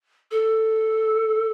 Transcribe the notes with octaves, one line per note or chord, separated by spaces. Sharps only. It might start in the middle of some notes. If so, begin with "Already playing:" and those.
A4